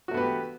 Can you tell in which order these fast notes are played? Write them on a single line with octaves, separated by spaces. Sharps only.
F#4 A3 B3 B4 G4